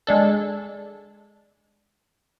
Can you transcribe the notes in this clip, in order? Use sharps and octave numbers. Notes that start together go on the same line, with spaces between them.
G#3 D4 A4